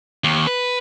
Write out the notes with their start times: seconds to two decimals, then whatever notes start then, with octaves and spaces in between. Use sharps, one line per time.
0.24 D#2
0.47 B4